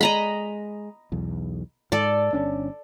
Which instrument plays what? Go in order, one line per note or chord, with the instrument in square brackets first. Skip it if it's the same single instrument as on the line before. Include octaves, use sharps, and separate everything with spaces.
[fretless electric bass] G#3 [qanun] D#5 A#5 B5
[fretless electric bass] B1 E2
[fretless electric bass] G#2 [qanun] A4 D5
[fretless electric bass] G1 C#4 D4